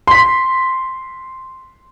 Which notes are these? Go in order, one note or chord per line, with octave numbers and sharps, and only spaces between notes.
C6 B6